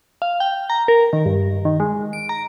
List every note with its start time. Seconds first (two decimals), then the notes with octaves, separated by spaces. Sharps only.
0.22 F5
0.40 G5
0.70 A#5
0.88 A#4
1.13 D#3
1.25 G2
1.65 D#3
1.80 G#3
2.13 D7
2.29 A#5